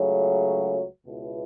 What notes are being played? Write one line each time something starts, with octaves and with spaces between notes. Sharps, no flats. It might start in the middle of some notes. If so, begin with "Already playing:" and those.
Already playing: C#2 C#3 F#3 A3
C#2 B2 B3 E4